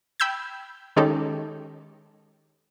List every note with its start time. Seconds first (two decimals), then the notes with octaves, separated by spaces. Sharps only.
0.20 G5 B5 E6 G6 G#6
0.96 D#3 G#3 C#4 D#4 G4 A4